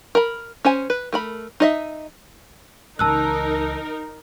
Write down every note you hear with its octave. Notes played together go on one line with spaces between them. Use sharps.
A#4 B5
C#4 C5 G#5
B4
A3 A#4 B5
D#4 D#5 E5
C#2 E3 D#4 A#4 A5 E6 F#6